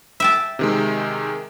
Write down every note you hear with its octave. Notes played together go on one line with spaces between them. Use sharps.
E5 G5 A5
C3 D#3 G#3